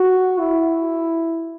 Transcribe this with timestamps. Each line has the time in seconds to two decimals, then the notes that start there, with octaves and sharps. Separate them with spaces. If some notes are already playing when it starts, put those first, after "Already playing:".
Already playing: F#4
0.40 E4